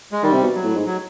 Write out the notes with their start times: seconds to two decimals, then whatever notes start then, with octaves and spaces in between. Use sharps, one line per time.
0.12 G#3
0.23 D#3 G3
0.33 C3
0.44 B2
0.54 F#3
0.64 A2
0.75 G#2
0.86 F#3